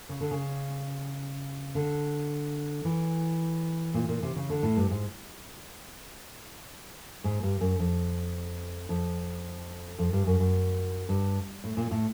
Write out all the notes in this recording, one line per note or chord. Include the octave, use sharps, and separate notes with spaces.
C#3
D3
C#3
D3
E3
A#2
A#2
C3
C#3
D3
A2
G2
G#2
G#2
G2
F#2
F2
F2
F2
G2
F#2
F#2
G2
A2
A#2
A2